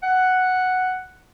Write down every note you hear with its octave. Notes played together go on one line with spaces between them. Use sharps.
F#5